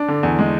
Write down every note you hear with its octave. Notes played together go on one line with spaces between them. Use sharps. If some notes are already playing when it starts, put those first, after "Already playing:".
Already playing: D4
D3
E2
G#3